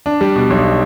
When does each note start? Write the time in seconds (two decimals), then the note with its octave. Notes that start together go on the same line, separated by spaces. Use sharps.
0.06 D4
0.21 G3
0.36 B2
0.50 B1